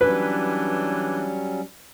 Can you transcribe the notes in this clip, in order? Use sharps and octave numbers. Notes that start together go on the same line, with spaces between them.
E3 F#3 G3 C#4 D4 B4